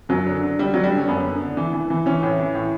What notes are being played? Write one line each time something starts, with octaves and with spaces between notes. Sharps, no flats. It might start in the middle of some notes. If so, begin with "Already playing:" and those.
F#2 F#3
D3
D3
D3 G3
D3 F#3
G3
D3
C#4
F#2 B3
D3
D3
E3
E3
E3
E3 C#4
A2
E3
A2